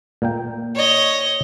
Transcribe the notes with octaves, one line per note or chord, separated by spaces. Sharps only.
A#2 A#3 G5
C#5 D#5